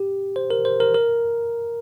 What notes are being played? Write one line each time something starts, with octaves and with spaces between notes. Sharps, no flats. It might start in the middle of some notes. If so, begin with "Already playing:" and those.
Already playing: G4
C5
A#4
C5
A#4
A#4